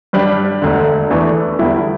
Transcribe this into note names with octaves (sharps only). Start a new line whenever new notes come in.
G2 G3 D4 G4
E1 D2 D3
E2 E3 A3 D4
E2 D3 G3 E4